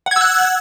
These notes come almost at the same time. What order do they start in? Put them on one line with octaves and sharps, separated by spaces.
F#5 G#6 E6 F#6